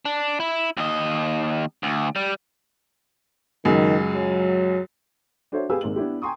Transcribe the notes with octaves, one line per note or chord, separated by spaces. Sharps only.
D4
E4
D#2 D#5
D2
G3
C#2 F#2 D#3
F#3
D4 F#4 A4 C5 C#5 E5
G4 G#4 B4 F5 G#5 E6
G#1 G#3 A#3 D#4 F#7
B3 D4 E4 G4
G5 G#5 A#5 C6 C#6 D#6